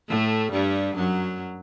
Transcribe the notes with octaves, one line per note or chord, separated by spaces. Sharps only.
A2 A3
G2 G3
F#2 F#3